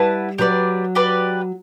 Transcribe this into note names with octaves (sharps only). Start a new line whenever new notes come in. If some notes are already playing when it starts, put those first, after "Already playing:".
Already playing: G3 E4 B4 F#5 A5
F#3 G4 B4 D5
G4 B4 D5